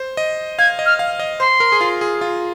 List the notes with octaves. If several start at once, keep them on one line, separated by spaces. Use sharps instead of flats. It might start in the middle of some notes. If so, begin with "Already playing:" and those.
Already playing: C5
D#5
F5 G#6
D#5
F6
F5
D#5
C5 C6
A#4
G#4
F4
G#4
F4